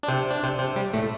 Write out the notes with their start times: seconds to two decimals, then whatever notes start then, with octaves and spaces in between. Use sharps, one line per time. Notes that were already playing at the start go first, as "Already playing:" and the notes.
0.03 D4
0.08 C3 C4
0.31 D4
0.42 C3 C4
0.59 C3 C4
0.76 G3
0.93 A2 A3